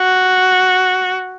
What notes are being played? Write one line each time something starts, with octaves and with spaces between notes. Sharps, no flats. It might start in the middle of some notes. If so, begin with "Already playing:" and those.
Already playing: F#4